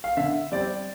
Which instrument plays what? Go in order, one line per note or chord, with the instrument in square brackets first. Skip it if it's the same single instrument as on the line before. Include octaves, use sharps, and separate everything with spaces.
[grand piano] F5
D3 E5
G3 C4 D5